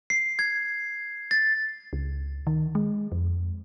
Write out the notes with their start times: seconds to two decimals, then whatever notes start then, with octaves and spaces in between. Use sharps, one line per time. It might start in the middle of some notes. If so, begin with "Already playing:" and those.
0.10 C7
0.39 G#6
1.31 A6
1.93 C#2
2.47 D#3
2.75 G#3
3.12 F2